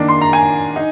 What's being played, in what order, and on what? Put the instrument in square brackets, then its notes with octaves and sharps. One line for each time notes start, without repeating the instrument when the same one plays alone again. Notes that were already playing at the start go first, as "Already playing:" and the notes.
Already playing: [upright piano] D#3 A#3 D4
C6
A#5
G#5
D#4